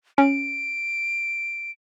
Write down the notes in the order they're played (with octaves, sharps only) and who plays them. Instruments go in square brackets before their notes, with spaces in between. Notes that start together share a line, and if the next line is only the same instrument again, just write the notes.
[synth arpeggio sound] C#4 [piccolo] D7